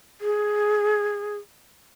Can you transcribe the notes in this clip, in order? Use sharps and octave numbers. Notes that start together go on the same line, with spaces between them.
G#4